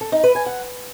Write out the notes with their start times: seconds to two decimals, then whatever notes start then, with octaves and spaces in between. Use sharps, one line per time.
0.01 A4
0.12 D#4
0.24 B4
0.35 G#5
0.46 F#5